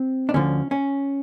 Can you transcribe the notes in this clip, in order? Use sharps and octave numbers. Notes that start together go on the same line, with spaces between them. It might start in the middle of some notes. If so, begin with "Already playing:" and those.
Already playing: C4
D4
D2 D3 F3 C#4
C#4